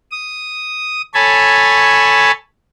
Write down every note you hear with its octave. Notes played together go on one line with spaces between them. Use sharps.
D#6
A4 C#5 G#5 A5 B5